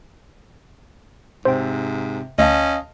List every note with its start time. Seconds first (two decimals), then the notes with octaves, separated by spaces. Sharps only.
1.45 G#2 C3 C5 G5
2.38 D2 C#4 D#5 F5 A5